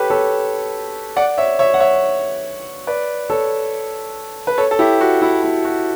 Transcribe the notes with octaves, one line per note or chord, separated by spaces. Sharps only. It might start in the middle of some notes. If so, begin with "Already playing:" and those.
Already playing: G4 A4 B4 C#5
A4 C#5
D5 F#5
C#5 E5
C#5 E5
F#5
C#5 E5
B4 D5
A4 C#5
B4
A4 C#5
A4
E4 G4
F#4
E4
E4
F#4